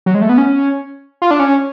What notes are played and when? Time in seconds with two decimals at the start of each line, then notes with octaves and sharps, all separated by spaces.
0.06 F#3
0.15 G#3
0.21 A3
0.29 B3
0.38 C#4
1.22 F4
1.31 D4
1.40 C#4